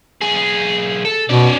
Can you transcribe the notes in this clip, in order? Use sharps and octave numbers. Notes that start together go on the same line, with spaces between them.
B1 G#4
A4
B2 C#4 D5